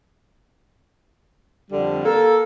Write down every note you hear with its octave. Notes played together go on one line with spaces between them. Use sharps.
F2 D3 G3
A#3 A4